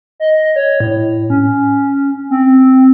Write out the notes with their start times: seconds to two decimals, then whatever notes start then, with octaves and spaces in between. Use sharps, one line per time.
0.20 D#5
0.56 C#5
0.80 A2
1.30 C#4
2.30 C4